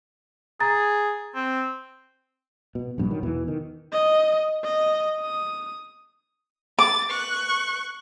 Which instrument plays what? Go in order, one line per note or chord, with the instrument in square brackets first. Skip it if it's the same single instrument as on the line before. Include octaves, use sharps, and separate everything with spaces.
[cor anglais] G#4 [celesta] A#5 A6
[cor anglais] C4
[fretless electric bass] B2
A#1 G2 B2
D#3 F#3
E2 B2 E3
D#3
[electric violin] D#5
D#5
D#6
[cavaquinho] D6 [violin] A6
[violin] C#6 F#6